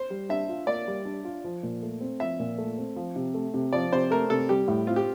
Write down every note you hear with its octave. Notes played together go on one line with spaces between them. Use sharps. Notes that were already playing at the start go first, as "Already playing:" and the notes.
Already playing: C5
G3
D4 E5
F4
A#3 D5
G3
D4
F4
F3
A#2
A3
C4
F3 E5
A#2
A3
C4
F3
C3
A3
C3
F3 D5
C3 C5
A3 A#4
C3 A4
G3 G4
A2
C4 F4
G4